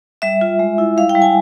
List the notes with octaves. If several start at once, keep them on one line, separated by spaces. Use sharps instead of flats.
G3 E5
F4
G#3
E4
G3 F5
G5
G3
G#5